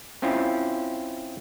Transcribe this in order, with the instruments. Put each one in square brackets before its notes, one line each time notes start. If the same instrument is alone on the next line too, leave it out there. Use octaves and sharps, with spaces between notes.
[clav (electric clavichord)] C4 C#4 E4 F4